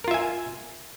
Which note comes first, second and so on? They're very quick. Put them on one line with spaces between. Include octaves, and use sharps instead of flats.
A#4 F4 E5 G#5